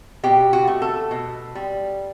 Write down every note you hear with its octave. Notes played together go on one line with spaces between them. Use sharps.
B2 G4
F#4
A3
A4
B2
G3